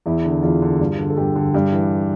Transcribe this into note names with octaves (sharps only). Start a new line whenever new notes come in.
E2 E4
D3
E2 F4
D3
G2
D3
A4
G2 G4
D3
G2
E3